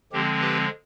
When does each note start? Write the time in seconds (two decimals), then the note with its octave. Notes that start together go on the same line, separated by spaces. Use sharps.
0.13 D3 F3 G#3 C4 G4
0.40 G4 B4